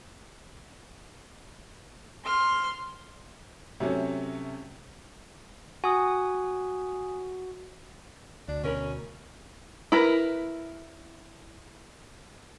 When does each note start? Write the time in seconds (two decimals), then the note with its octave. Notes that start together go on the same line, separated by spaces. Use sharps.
2.25 C6 F6
3.80 C3 F#3 A3 C#4
5.84 F#4 G#5 D#6
8.48 D2 D4
8.64 B2 C#4 A#4 B5
9.92 E4 A#4 B4